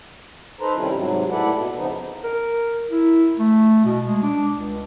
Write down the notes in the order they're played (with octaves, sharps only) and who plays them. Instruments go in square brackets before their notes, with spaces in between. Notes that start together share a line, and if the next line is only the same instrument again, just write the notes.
[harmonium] D#4 A4 B4 C5 A#5
C3 D#3 G3 C#4 E4 F4
G#2 C3 F#3
A2 E4 A4 B4 D5 F#5
B2
F2 C#3 F3 B3 D#4
[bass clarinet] A#4
E4
A3
B2
G#3
D4
C#2